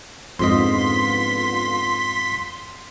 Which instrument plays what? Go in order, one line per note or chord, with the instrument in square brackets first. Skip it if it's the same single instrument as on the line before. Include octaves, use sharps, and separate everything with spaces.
[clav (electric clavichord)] F2 G#2 D#5 [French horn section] D3 B3 F4 [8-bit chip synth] C6 B6